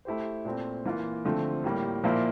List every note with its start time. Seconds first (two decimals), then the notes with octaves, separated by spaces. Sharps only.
0.05 A3 E4 G4 C5
0.45 A#2 A3 C4
0.85 E3 A#3 F4
1.25 D3 F3 A3 C4
1.64 A2 G3 A#3
2.04 A#2 F3 A#3 E4